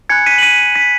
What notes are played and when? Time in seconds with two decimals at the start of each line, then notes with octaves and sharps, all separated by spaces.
0.09 G#5 B5 F#6 G#6 C#7
0.26 B6 D#7
0.38 F#7
0.43 B6 D#7
0.59 B6
0.76 B6